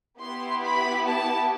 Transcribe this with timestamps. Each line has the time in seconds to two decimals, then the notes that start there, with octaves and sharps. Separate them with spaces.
0.19 B3 E4 G4 C6
0.62 B5
1.06 A5